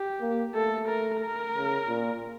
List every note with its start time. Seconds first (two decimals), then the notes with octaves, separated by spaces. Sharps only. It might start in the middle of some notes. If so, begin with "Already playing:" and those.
Already playing: G4
0.21 A#3
0.55 A3 A4
0.88 A#4
1.21 A#4
1.55 C#3
1.88 A#2